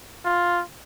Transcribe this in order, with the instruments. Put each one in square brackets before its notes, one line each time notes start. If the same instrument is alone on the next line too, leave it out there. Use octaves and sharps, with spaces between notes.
[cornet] F4